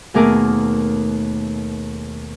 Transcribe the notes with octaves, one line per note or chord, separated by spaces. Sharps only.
D#2 B2 A3 G#4 A#4 D6